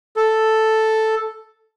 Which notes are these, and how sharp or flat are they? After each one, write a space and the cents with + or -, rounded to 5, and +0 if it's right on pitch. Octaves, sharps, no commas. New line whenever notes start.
A4 +0